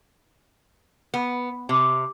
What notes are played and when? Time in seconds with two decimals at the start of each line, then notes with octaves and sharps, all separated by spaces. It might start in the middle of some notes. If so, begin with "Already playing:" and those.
1.14 B3
1.69 C3